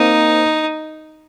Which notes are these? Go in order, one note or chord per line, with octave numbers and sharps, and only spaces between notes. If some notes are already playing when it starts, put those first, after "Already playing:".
Already playing: A#3 C4 D#4